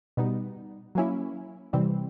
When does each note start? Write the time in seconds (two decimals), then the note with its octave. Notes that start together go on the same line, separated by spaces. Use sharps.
0.17 B2 G3 B3 D#4
0.95 F#3 A#3 C#4 E4
1.73 C3 E3 G3 C4